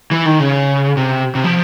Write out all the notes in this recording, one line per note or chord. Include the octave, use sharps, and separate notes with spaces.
E3
D#3
C#3
C3
C3
F3